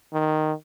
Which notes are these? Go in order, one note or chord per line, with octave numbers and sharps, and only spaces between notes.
D#3